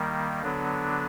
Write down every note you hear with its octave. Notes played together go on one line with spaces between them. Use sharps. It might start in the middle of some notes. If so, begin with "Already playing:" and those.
Already playing: D#3 G3 A#3
D3 F#3 B3 D4